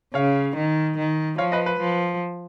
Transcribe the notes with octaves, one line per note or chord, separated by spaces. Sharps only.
C#3 C#5 F5
D#3
D#3
F3 C#5 F5
B4 D#5
B4
F3